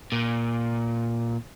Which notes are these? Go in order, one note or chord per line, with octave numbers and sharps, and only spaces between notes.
A#2